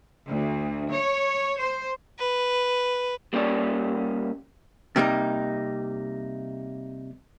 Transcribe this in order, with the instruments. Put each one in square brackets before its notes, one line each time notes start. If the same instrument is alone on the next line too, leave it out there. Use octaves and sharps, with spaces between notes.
[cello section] D2
C#5
C5
[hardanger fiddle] B4
[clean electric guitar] G3 A#3 C#4 G4 D5
[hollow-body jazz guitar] C3 G3 A#3 D#4